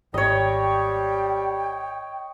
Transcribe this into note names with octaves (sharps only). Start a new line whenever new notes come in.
G#1 G3 C#5 D#5 G5